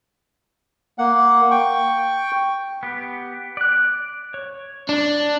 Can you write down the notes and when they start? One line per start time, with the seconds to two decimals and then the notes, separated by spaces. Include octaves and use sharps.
0.98 A#3 F#5
1.51 G5 C#6
2.83 B3 G4
3.57 D5 F#6
4.34 C#5
4.89 D4